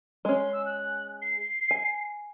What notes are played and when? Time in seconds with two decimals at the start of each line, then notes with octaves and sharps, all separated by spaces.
0.25 G#3 C#4 C6
0.53 E6
0.65 F#6
1.22 C7
1.71 G#5